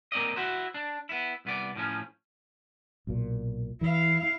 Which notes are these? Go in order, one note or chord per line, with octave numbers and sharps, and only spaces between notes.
A#3 C4 D5 D#5
E4 F#4 C5
D4
B3 E4
C2 B3 D5
A2 F3 C#4
B1 A#2
E3 E4 F5